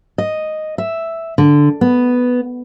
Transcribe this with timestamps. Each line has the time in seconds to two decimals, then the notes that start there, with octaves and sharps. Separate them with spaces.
0.18 D#5
0.78 E5
1.38 D3
1.81 B3